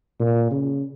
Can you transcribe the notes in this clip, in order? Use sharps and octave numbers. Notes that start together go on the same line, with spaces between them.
A#2
C#3